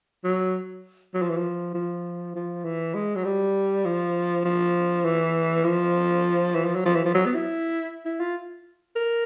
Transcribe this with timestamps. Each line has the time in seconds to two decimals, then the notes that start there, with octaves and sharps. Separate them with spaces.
0.24 F#3
1.14 F#3
1.22 F3
1.30 E3
1.37 F3
1.74 F3
2.35 F3
2.65 E3
2.95 G#3
3.15 F#3
3.25 G3
3.85 F3
4.45 F3
5.05 E3
5.65 F3
6.55 E3
6.65 F3
6.75 F#3
6.86 F3
6.95 E3
7.05 F3
7.15 F#3
7.25 B3
7.35 E4
8.05 E4
8.20 F4
8.95 A#4